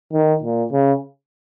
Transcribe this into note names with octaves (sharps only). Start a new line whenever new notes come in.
D#3
A#2
C#3